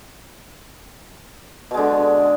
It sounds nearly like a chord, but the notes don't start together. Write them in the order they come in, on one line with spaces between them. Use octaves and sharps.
B2 G#3 D3